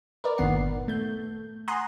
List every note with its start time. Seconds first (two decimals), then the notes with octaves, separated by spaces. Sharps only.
0.24 A#4 B4 D5
0.38 G1 A#2 D#3 B3 F#5 C7
0.88 A3 G6
1.68 F#5 G#5 A#5 C6 D#6 F#6